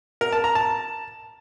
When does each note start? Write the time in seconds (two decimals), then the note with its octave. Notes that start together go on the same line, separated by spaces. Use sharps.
0.21 A#4
0.33 A5
0.44 A#5
0.55 A5